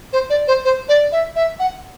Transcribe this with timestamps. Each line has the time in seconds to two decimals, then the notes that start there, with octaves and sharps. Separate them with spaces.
0.13 C5
0.30 D5
0.48 C5
0.65 C5
0.89 D5
1.12 E5
1.36 E5
1.59 F#5